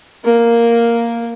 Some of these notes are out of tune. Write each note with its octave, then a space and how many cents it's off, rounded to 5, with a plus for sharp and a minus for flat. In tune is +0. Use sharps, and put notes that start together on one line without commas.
A#3 +0 A#4 +0